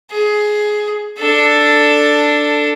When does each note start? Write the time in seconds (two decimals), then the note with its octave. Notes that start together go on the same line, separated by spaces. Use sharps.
0.11 G#4
1.18 D4 A4